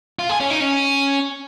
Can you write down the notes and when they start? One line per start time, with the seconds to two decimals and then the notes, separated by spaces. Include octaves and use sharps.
0.19 F4
0.30 G#4
0.40 C#4
0.50 D#4
0.60 C#4